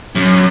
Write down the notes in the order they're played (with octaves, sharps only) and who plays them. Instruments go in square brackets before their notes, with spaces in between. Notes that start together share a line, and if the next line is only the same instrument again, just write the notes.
[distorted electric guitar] F#2